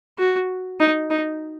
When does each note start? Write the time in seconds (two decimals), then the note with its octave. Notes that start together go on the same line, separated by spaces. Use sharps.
0.18 F#4
0.80 D#4
1.10 D#4